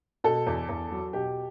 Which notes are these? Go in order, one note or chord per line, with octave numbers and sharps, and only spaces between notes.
B2 A4
E2
E2
F#3
B2 G4